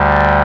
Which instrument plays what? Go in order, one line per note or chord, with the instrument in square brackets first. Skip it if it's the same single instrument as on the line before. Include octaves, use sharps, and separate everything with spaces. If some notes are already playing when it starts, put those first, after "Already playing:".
Already playing: [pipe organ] D2 D3 G3